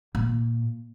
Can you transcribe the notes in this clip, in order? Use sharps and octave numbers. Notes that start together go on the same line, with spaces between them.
A#2